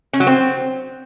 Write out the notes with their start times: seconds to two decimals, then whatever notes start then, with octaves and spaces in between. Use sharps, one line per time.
0.13 C#4
0.20 F#3
0.27 C4